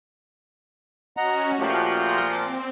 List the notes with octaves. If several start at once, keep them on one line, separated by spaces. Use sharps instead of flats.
C#4 F#4 D#5 F#5 A#5
A#2 F3 A3 F#4 G4 F#6
C6 A#6
C4 D6